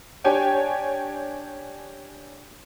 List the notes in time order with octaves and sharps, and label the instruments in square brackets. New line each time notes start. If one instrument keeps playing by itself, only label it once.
[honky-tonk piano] D4 G4 C#5 G5 G#5